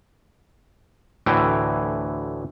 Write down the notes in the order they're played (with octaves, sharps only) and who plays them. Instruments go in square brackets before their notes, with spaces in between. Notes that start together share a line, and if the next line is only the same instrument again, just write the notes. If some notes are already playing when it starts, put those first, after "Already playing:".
[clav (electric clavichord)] D2 A2 E3 G5